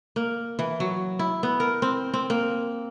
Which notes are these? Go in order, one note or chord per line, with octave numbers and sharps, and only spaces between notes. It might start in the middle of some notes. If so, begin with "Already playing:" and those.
A#3
E3
F#3
E4
B3
A#4
C4
C4
A#3